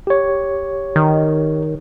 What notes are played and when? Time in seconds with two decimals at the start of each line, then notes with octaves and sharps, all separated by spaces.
0.07 G4 C#5
0.96 D#3